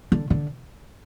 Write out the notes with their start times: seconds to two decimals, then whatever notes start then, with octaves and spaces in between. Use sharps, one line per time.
0.12 D3
0.30 D3